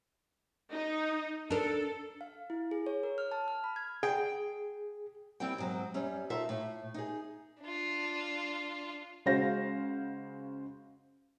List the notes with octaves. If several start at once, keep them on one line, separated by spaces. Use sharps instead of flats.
D#4
D4 A4 A#4
F5
E4
G#4
C#5
A#4
F6
A5
F6
B5
G#6
G#4 G5
G3 C4 E4 G4 G5
G#2 F#3 C4
F#2 G3 C#4
D#4 F4 A4 E5
A2
D#4 G#4
D4 F4
C#3 G#3 F#4 C5 F5 A#6